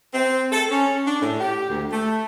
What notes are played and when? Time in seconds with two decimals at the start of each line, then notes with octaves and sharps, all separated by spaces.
0.13 C4
0.52 A4
0.71 C#4
1.07 D4
1.22 A2
1.40 G4
1.69 D2
1.91 A3